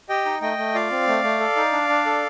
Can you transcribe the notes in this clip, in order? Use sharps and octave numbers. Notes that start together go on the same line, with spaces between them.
G4 D#5 G5
D#4
A3 D#5 G5
A3
F4 D5 F5
C4
A3
A3
A4
D#4
D4
D4
A4